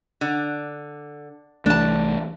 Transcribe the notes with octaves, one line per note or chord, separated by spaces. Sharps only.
D3
C2 E3 A3 D4 A5